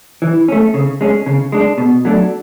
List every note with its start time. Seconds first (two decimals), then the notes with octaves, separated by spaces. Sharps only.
0.22 E3
0.48 A3 C#4
0.74 C#3
1.01 G#3 C#4
1.26 C#3
1.52 G#3 D4
1.78 B2
2.05 F#3 A3 D4